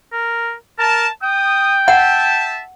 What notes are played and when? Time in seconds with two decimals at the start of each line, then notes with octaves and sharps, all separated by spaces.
0.13 A#4
0.78 A#4 A5
1.23 G5 D#6
1.88 E5 F#5 A5